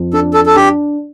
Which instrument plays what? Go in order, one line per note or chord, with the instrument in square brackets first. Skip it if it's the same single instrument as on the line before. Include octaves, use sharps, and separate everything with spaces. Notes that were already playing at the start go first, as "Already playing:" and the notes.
Already playing: [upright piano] F2
[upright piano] D4 [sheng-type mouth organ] A4
[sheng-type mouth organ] A4
A4
[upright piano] D4 [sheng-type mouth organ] G4